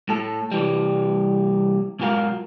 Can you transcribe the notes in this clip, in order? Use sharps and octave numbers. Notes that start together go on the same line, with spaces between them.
A2 A4
C2 E3 G3
B1 G#2 F4 F#4 A#4 F5